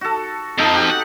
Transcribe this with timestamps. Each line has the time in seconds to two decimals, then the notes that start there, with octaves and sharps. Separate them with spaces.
0.01 F#4 A4
0.59 F2 F3 D#4 A4
0.73 F#4 G4
0.90 F#5